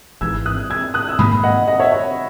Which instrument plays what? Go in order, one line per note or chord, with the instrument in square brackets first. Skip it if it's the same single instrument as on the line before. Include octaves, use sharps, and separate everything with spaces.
[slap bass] G#1 G#2 E3 [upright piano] E6 G#6
[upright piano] D#6 F#6
E6 G#6
D#6 F#6
E6
[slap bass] G#2 D#3 A#3 [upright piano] B5 D#6
[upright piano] D#5 F#5
D#5 F#5
C#5 E5
C#5